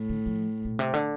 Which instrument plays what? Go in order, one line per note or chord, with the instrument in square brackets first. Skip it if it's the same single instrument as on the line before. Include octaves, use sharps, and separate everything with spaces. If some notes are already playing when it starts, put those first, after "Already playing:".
Already playing: [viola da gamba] A2
[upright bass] D3
F3
A#2
C3
D3